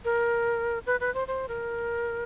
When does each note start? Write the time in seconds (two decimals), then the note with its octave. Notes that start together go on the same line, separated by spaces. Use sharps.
0.05 A#4
0.87 B4
1.00 B4
1.14 C5
1.28 C5
1.48 A#4